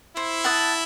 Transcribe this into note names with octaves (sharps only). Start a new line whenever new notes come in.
E4 C5
F#5 A5 D#6